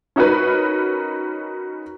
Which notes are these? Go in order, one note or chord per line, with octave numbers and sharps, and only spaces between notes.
C#4 D#4 F#4 A#4 B4